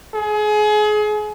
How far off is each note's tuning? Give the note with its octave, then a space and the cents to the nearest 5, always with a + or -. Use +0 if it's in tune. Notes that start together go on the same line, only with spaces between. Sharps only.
G#4 +30